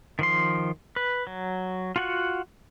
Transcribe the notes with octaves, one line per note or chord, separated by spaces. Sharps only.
D#3 F3 C6
B4
F#3
F4 F#4 F#5